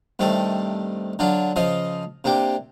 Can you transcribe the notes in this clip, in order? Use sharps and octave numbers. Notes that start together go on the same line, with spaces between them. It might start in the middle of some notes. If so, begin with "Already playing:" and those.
G2 C3 D#3 A3 A4
D3 F#3 D4 F4
C#3 F3 D#5 F5
C3 A#3 D4 G4